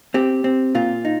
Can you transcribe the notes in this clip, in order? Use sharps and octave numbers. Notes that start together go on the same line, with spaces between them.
C4 G4
C4
A#2 F4
D#4